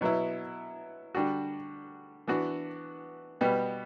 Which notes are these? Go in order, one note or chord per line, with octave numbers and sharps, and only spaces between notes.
B2 F#3 B3 E4
D3 G3 D4 F#4
E3 B3 D4 F#4
B2 G3 B3